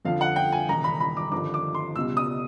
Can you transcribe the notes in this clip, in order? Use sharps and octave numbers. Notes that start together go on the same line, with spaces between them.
F2 D3 F3 F5
F#5
G5
G#5
E1 D#2 C#3 A#5
B5
B5
D6
G#1 G2 D3 F3 D6
D6
C6
C#2 B2 G3 E6
D#6